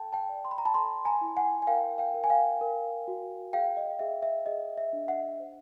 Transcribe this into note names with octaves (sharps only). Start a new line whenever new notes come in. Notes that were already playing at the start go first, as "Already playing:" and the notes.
Already playing: A4 G5 A5
G5 A5
D5
C6
B5
A#5
A5 B5
A4 A#5 C6
G#5 A#5
E4
F#5 G#5
G#5
A#4 F5 G5
F5 G5
A#4
G#5
F5 G5
A#4
F#4
G#4 F5 G5
D#5
G#4 E5
E5
G#4 D#5
E5
D4
E5 F#5
C5